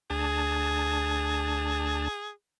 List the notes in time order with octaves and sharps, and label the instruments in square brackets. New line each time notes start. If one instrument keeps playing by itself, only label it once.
[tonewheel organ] D2 D4 A5 [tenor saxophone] G#4